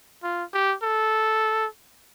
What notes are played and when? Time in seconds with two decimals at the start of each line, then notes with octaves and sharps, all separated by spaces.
0.23 F4
0.53 G4
0.83 A4